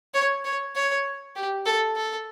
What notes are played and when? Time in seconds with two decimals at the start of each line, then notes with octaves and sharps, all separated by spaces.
0.14 C#5
0.45 C#5
0.76 C#5
1.36 G4
1.66 A4
1.96 A4